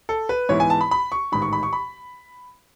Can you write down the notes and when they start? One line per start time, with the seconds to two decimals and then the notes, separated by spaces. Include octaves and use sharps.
0.09 A4
0.29 B4
0.49 G#2 E3 B3 E4 C#5
0.60 G#5
0.70 A5
0.81 B5
0.91 B5
1.12 C#6
1.32 A1 G#2 D#3 B5
1.42 C#6
1.53 B5
1.63 C#6
1.73 B5